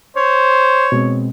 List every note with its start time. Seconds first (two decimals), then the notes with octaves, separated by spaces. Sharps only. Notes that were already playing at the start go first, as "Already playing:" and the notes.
0.17 C5 C#5
0.92 B2 G#3 C4